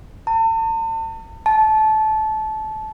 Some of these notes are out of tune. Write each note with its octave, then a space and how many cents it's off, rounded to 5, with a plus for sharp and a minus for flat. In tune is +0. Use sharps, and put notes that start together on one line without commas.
A5 +40
A5 -20